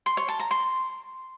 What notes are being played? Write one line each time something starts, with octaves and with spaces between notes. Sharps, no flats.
C6
C#5
A5
A#5
C6